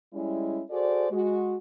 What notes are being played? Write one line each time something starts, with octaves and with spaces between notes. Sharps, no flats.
G3 G#3 C#4 E4
F#4 G#4 A4 C5 D5
G#3 F#4